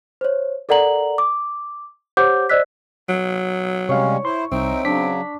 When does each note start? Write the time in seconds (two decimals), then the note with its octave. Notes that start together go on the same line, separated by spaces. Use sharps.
0.21 C5 C#5
0.69 A4 A#4 D5 F#5 A#5 F#7
1.18 D6
2.17 G4 C5 C#5 F#5 D6 G6
2.49 C5 D5 D#5 E6 F#6 B6
3.09 F#3
3.89 C3 G3 G#3 C#4 C#5 F5
4.25 E4 C5 C6
4.52 C2 C4 D#4 E5
4.85 C#3 F#3 D4 B6